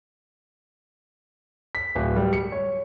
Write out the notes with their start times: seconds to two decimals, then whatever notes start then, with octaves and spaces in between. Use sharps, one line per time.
1.75 B6
1.95 D1
2.16 G3
2.33 C#7
2.52 C#5